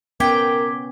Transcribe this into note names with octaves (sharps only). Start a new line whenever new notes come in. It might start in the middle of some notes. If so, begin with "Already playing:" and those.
B3 C#4 A#4 G5 D6 G#6 B6